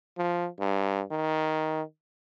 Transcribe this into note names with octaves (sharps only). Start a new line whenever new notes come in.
F3
G2
D#3